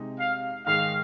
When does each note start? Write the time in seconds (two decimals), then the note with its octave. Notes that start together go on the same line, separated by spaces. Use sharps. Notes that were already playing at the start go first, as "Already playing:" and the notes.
Already playing: C3 G#3 D#4
0.19 F5
0.66 G#2 D#3 G#3 D#4 F5